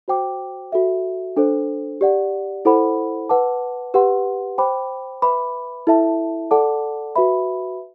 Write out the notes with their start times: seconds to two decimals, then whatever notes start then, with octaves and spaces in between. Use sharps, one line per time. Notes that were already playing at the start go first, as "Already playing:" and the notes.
0.08 F#4 C5 G5 D6
0.72 F#4 A4 E5
1.37 D4 A4 C5
2.01 G4 D5 F#5
2.65 E4 A4 C5 F#5 B5
3.29 B4 F#5 A5 D6
3.94 G4 B4 F#5 C6
4.58 C5 G5 B5 D6
5.22 B4 E5 B5 D6
5.87 E4 A4 E5 A5
6.51 A4 D5 F#5 A5 D6
7.16 F#4 B4 E5 B5